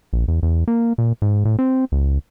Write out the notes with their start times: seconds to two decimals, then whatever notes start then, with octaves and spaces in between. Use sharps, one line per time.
0.13 A#1
0.28 E2
0.43 E2
0.68 A#3
0.98 A#2
1.22 G#2
1.45 A2
1.59 C4
1.92 C#2